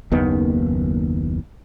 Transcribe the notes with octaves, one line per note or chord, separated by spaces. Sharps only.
F#1 D#2 D#3 B3